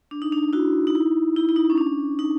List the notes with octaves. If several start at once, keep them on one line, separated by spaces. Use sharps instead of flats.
D4
D#4
D4
E4 F#4
D#4
E4
E4
E4
D#4
C#4
D4
D#4